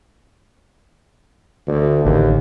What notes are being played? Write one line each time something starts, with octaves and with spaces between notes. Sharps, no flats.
D2
A1 D#2 D3